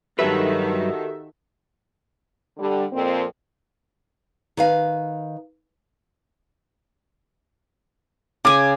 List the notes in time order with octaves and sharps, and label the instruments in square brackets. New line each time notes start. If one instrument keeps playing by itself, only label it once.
[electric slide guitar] G2 F#3 B4 [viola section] D#3 [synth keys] F#4 A4 E5 [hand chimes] G4
[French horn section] D3 G3
F2 A#2 C4
[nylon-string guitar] D#3 B4 F5
[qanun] C#3 G#5 [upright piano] D6